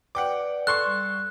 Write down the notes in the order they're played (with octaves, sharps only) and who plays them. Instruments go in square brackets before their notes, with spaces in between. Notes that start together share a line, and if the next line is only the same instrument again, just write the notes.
[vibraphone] B4 D5 [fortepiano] F#5 G5 D6
[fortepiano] A4 C6 C#6 [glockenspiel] F#6
[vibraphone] G3